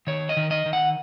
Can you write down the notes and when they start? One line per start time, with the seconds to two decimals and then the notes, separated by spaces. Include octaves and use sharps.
0.07 D#3 C#5
0.29 D#5
0.37 D#3
0.51 D#5
0.66 D#3
0.73 F#5